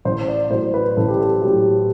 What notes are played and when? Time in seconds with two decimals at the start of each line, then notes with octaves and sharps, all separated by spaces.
0.05 A1 C5
0.28 D5
0.50 A2 C5
0.54 F#3
0.74 B4
0.97 A1 A4
1.08 G4
1.19 A4
1.42 A2 F#3 G4